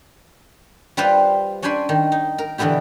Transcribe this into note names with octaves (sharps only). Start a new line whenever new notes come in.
G3 F4 B4 C5 F5 C6
C#4 D4 G5 G#5 B5 C6
D#3
D#4
A#4
B2 D3 E3 B3 E4 G4